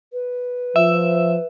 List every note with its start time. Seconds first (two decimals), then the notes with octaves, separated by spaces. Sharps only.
0.13 B4
0.76 F3 E5